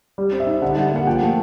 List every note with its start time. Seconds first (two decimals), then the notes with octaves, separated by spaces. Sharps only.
0.18 G3
0.33 C4
0.40 E5
0.47 D#4
0.62 D3 F#5
0.76 G3
0.92 A#3 F#5
1.07 F3 G5
1.22 A3